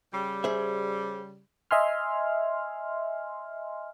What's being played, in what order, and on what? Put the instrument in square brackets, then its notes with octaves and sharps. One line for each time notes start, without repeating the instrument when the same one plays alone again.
[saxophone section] C#3 G3
[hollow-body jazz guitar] G#4 C5 E5
[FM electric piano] D#5 E5 G#5 C6 F6